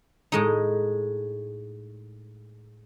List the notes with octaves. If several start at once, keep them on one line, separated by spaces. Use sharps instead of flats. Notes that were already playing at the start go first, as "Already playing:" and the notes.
A2 G#3 D#4